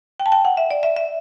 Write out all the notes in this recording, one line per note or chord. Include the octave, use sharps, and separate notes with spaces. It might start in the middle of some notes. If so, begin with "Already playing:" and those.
G5
A5
G5
F#5
E5
D5
E5
E5